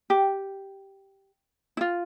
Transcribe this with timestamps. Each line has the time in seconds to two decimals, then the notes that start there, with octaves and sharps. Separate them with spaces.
0.10 G4
1.77 E4
1.81 F4